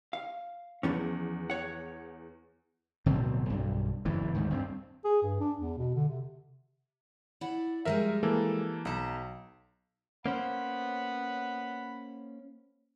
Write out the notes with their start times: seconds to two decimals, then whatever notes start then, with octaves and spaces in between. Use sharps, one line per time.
0.13 F5
0.83 E2 F3 B3 C#4
1.50 C#5 F#5
3.06 D1 B2 F#3 C4
3.50 B1 G2
4.05 F#1 E2 G2 E3
4.34 D2 G#2 D#3
4.50 G2 A#3 C4
5.05 G#4
5.23 G2
5.40 D4
5.58 E2
5.78 B2
5.95 D3
6.08 C3
7.41 E4 D5 F#5
7.85 F3 G3 G#3 A#4 E5
8.23 E3 A#3 A4
8.85 B1 A5 A#5
10.26 A#3 C#4 C5 F#5 B5